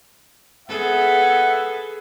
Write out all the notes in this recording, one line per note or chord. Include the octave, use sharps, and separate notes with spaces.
B3 G#4 A4 E5 F#5